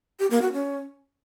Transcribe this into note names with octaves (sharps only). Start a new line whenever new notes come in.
G4
A#3
F#4
C#4